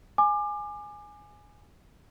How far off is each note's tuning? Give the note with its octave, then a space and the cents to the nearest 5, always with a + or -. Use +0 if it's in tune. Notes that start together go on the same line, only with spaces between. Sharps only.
G#5 +0 D6 +30